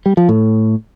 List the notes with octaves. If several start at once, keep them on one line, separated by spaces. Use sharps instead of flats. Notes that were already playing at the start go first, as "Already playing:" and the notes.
G3
F3
A2